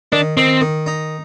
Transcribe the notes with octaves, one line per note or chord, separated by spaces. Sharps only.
D#3 D4
D#3 C4
D#3
D#4